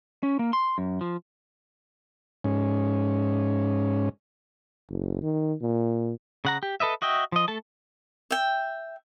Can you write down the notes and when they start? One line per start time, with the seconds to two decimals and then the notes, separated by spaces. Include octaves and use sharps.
0.23 C#4
0.39 A#3
0.53 C6
0.78 F#2
1.01 F3
2.44 G#2 C#4
4.89 F#1
5.22 D#3
5.62 A#2
6.45 C#3 F#5 A#5
6.63 G4
6.80 A4 B4 D#5 E5
7.02 F#4 D#5 E5 G5
7.32 F3 D#5
7.48 A3 A4 A5
8.31 E5 G5